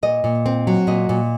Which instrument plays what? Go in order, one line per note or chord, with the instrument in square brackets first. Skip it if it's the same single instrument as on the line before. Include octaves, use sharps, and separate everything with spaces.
[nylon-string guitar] A#2 D#5
A#2
C4
F#3
A#2 D#5
A#2